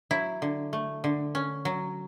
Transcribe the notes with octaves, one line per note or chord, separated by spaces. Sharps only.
F#3 E4
D3
A3
D3
C#4
F#3